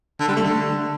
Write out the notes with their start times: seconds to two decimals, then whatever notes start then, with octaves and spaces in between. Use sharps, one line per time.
0.20 D3
0.28 G3
0.36 A3
0.44 D3